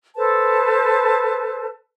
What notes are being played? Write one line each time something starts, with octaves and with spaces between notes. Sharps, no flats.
A4 B4 C5 A5